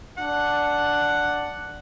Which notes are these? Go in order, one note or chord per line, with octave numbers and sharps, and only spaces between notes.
D4 F#5